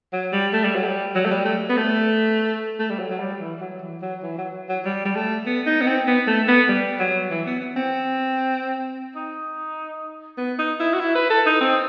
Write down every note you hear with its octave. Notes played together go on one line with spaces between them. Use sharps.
F#3
G3
A3
G3
F#3
G3
F#3
A3
G3
A3
B3
A3
A3
G3
F#3
F#3
G3
E3
F#3
E3
F#3
E3
F#3
F#3
G3
G3
A3
B3
D#4
B3
C4
B3
A3
B3
G3
F#3
E3
B3
B3
C4
D#4
B3
D#4
E4
F#4
E4
B4
A4
D#4
C4